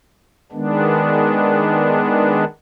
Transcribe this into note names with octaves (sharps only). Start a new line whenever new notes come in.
D#3 G#3 B3 D4